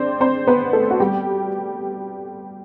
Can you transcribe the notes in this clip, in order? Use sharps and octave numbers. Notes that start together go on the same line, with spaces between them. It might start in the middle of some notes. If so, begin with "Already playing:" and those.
Already playing: C4 D4 C5 D5
C4 C5
B3 B4
A3 A4
F#4
G3 G4